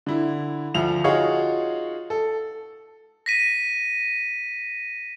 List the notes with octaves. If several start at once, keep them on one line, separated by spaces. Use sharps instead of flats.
D3 E4
D2 F3 F7
D#4 F4 F#4 G#4 C#5 C#6
A4
A#6 B6 D#7